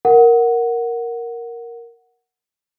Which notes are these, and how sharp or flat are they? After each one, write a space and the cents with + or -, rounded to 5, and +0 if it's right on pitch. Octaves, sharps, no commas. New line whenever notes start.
A#4 +0 F#5 +0